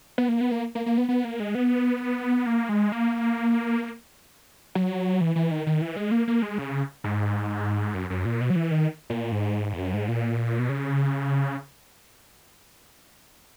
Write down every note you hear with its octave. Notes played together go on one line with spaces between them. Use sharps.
B3
A#3
B3
A#3
A#3
A#3
B3
B3
A#3
G#3
B3
A#3
G#3
A#3
F#3
E3
E3
D#3
D#3
E3
G#3
A#3
A#3
G#3
C#3
G#2
F#2
F#2
A#2
B2
F#3
E3
D#3
A#2
G#2
E2
F#2
G#2
A#2
B2
C#3